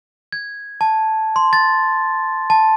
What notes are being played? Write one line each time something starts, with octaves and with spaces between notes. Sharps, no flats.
G#6
A5
C6
A6
A5